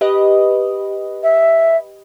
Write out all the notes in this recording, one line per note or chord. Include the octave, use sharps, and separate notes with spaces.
G4 B4 D#5
E5